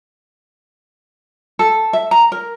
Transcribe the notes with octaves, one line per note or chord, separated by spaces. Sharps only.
A4
E5
A#5
A#4